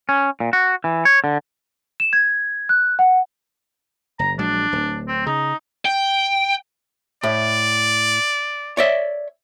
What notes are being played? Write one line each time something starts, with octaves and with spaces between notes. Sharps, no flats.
C#4
A#2
F#4
E3
C#5
D3
E7
G#6
F#6
F#5
F#1 A#5
A#1 F#3 G#3 D4
D1
C4
C#3 D#4
G5
A2 D5
C#5 D5 E5